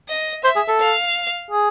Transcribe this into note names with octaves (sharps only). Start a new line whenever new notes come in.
D#5
C5 E5
G#4
A4
F5
G#4